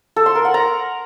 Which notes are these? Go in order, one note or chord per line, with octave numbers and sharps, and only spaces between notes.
A4
C6
A#4
F#5
A#5